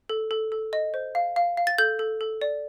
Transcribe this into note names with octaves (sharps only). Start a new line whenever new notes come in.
A4
A4
A4
D#5
C5
F5
F5
F5
A6
A4 G6
A4
A4
D5